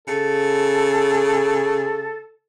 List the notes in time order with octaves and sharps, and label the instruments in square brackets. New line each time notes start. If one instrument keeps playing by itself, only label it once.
[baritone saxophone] C#3 [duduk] A4